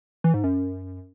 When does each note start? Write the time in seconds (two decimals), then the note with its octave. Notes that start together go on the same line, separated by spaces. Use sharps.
0.24 E3
0.34 G#2
0.44 F#2